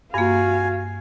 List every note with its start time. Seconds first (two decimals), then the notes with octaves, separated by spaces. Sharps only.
0.14 G2 A#3 F#4 F5 G#5